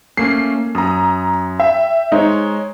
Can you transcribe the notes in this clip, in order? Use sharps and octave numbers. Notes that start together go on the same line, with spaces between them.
A3 A#3 C#4 C7
F#2 A#5 D#6
E5 G5
G#3 D#4 C5 C#5